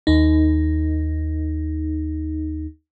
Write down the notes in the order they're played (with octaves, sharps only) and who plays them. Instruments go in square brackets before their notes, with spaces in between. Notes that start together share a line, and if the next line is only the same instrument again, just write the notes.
[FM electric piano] D#2 D#4